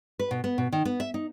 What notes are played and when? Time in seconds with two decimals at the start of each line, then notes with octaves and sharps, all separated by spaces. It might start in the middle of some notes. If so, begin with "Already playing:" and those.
0.19 B4
0.31 B2
0.44 B3
0.58 B2
0.72 D#3
0.85 B3
1.00 E5
1.14 D#4